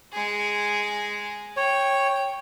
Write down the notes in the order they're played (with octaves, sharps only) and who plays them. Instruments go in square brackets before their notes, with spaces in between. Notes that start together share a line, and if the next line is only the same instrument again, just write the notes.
[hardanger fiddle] G#3 G#4
[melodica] C#5 [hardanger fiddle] G5